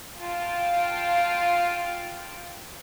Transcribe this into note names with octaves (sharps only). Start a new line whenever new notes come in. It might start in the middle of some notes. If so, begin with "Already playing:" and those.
F4 F5 G5 A5